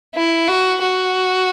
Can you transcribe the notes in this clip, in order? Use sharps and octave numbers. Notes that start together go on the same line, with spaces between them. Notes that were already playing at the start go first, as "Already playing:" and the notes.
E4
F#4
F#4